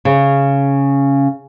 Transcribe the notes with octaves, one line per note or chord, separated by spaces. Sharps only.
C#3